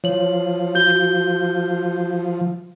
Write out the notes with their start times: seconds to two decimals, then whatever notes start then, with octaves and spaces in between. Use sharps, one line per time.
0.04 F3 C#5 F#7
0.75 F#4 G6 G7